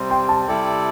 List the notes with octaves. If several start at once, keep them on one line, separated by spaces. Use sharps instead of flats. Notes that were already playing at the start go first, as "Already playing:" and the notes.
Already playing: C3 G3 C4
G5 C6
A5
C3 G3 E4 A4 D5 G5